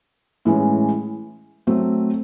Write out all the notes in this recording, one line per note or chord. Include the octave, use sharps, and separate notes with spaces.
A2 E3 G#3 C#4
F#3 A3 C4